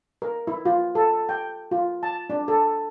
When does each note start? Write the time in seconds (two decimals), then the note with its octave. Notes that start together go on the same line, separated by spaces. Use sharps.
0.22 A#4
0.47 E4
0.65 F4
0.95 A4
1.29 G5
1.71 F4
2.03 A5
2.30 D4
2.48 A4